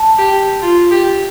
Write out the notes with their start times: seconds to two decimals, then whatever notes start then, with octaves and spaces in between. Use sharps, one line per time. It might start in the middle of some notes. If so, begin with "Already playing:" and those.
Already playing: A5
0.19 G4
0.62 F4
0.91 G4